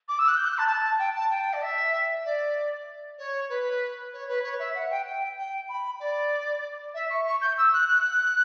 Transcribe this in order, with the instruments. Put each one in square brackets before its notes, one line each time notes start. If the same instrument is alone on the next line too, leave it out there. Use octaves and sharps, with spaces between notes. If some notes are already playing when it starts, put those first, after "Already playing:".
[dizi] D6
E6
F#6
G6
F#6
A5
A5
G5
A5
G5
D5
E5
D5
C#5
B4
C#5
B4
C#5
E5
F#5
G5
G5
G5
B5
D5
E5
C#6
C#6
G6
E6
F#6
F#6